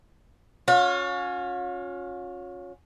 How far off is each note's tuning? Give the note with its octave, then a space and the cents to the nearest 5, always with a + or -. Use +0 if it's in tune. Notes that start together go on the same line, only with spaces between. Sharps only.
C#4 +5 F4 +45